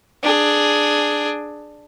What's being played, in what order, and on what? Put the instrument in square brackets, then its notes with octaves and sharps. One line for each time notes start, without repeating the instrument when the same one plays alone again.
[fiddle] D4 G#4